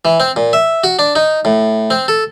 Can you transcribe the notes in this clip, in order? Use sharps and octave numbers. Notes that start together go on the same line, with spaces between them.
E3
C4
A#2
E5
F#4
D4
D#4
A2
C4
A4